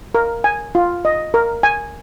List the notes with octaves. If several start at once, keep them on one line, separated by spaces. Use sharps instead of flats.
A#4
G#5
F4
D#5
A#4
G#5